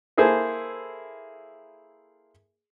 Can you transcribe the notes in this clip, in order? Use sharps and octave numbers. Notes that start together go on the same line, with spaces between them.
A#3 E4 G#4 A4 C5